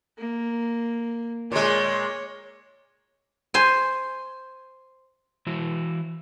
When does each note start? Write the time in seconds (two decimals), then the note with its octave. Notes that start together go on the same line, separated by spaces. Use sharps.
0.18 A#3
1.52 A#2 G#3 C#5
3.54 C5 G#5
5.47 E3 E4 F#4